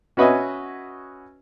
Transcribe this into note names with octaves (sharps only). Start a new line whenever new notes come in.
C#4 F#4 B4 D#5 E5 G#5